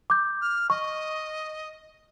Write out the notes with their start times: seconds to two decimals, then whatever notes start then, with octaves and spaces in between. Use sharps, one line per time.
0.10 D6 G6
0.41 F6
0.70 D#5 C#6